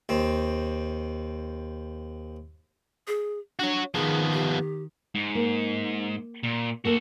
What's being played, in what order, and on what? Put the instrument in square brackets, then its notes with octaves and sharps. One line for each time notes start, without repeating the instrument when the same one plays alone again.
[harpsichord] D#2 C4
[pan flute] G#4
[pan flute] D4 [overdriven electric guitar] F#4 C#5
[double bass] D#3 [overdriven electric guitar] F3 B3 [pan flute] G#4
[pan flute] G4
[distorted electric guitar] G#2
[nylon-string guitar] A#3
[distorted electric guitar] A#2
[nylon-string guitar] A3 A#3 A#4 [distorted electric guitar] F#4 A4